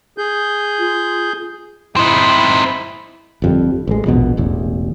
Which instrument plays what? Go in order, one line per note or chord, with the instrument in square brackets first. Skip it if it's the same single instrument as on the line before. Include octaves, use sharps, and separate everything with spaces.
[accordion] G#4 G6
[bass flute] F4
[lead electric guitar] C4 D#4 [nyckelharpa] E4 B5
[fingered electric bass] G1 F2 G3
A1 G#3
A#1 E2 B2
E1 A1 E2